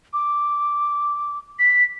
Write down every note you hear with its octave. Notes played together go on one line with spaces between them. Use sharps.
D6
B6